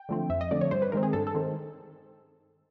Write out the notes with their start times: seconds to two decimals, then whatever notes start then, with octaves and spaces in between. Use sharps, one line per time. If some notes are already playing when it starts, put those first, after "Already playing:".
Already playing: G5
0.09 D3 F3 A3 C4
0.30 F2 E5
0.41 D#5
0.51 D3 F3 A3 C4 D5
0.61 C#5
0.71 G2 C5
0.82 B4
0.92 D#3 G#3 C4 A#4
1.03 G#4
1.13 G2 A4
1.27 A4
1.35 D#3 G#3 C4